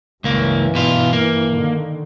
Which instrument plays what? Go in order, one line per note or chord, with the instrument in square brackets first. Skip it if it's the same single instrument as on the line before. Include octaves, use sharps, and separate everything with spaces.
[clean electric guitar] C#2 A#3 [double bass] G2 E3
[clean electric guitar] B2 F4
A#3
[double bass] D3 D#3